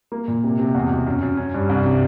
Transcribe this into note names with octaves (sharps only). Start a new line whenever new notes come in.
A#3
A#2
C3
C3
E2
B2
F#2
F#2
C#4
G2
C2
C3